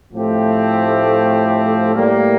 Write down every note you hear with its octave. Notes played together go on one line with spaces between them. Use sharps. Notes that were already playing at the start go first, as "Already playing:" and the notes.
A2 F3 A3 C4 G4
A2 G3 A#3